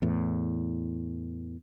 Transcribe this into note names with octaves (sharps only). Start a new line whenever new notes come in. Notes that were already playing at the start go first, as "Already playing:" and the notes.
E2 A2